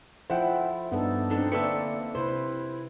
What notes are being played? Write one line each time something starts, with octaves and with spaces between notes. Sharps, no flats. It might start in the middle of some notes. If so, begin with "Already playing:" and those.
F3 E4 F4 A4 C5 F#5 G5
G2 B3 D4 D#4 A4
B2 C4 D4 D#4 A4
D3 A3 A#3 B4 E5 E6 C#7
C3 E4 B4 C5